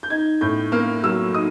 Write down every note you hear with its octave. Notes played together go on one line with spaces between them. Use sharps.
G6
D#4 G#6
A2 G6
A#3 F6
F#3 E6
D#4 D#6